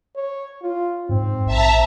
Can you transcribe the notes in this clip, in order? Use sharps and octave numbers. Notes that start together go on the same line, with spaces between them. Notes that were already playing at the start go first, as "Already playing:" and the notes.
C#5
F4
G#2 C4
A#1 E5 A5 A#5